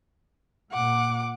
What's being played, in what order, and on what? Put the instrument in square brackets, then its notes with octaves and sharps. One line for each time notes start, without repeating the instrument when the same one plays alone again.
[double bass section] A#2 [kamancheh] F#5 D6